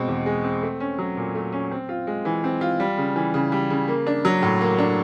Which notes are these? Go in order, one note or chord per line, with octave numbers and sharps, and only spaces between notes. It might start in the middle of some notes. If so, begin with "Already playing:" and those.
Already playing: B2 G#3 C4
E2
G#3
C4
A3
C#4
F#3
A#2
A3
C#4
C4
F4
G#3
E3
C4
F4
G3
C#3
E3
C#3
G3
C#3
A#3
D4
F#3
A2
A#3
D4